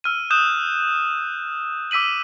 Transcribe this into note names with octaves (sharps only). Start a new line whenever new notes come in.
E6 F6 D#7
D#6 F#6 G6 E7
D6 E6 B6 D#7 F#7